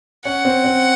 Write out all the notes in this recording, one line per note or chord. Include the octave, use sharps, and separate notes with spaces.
C#4 F#5
C4
C4